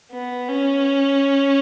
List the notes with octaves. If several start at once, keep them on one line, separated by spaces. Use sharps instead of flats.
B3
C#4